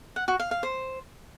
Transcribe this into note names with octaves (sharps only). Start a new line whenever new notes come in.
F#5
F#4
F5
F5
C5